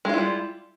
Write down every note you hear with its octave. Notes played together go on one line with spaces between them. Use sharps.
G3 G#3 E4 F4